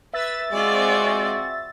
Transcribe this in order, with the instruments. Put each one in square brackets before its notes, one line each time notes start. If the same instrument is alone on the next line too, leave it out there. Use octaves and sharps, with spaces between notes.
[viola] B4 [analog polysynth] E5 E6 A6
[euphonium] G#3 [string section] C4 F#4 G#4 [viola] F4 D5